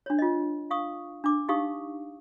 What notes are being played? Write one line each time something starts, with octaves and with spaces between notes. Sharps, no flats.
D4 C#5
F4 D#5
F5 C#6 D#6
D4 D6
D#4 G4 F5 C#6 D#6